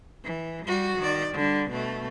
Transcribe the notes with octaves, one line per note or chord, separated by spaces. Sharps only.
E3
G3 F#4
D#3 D5
D3 G3
B2 A3